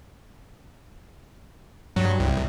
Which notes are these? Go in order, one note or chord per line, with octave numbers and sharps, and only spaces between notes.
G2 F#3
C2